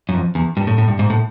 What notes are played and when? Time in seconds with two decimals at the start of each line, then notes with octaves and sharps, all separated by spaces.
0.09 F#2
0.14 F2
0.35 E2
0.57 G2
0.67 A2
0.78 A2
0.88 G2
0.99 G#2
1.10 A2